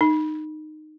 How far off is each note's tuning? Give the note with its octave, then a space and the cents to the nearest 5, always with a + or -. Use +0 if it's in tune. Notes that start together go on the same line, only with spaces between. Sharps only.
D#4 -15